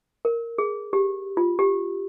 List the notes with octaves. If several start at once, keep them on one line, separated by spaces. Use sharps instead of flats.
A#4
G#4
G4
F4
G4